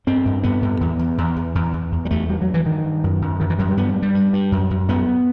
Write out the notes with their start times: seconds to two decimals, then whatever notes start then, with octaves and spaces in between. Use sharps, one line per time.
0.07 G2 C4
0.25 G2
0.43 G2 B3
0.62 G2
0.81 E2
0.99 E2
1.18 E2
1.36 E2
1.55 E2
1.73 E2
1.92 E2
2.05 G3
2.11 E2 A3
2.29 G2 G3
2.41 F#3
2.48 G2
2.54 E3
2.66 G2 D#3
2.85 G2
3.04 F#2
3.22 F#2
3.40 F#2 D#3
3.50 E3
3.58 F#2 F#3
3.68 G3
3.77 G2 B3
3.89 G3
3.96 G2
4.02 G3
4.15 G2
4.33 G2
4.52 F#2
4.71 F#2
4.89 F#2 B3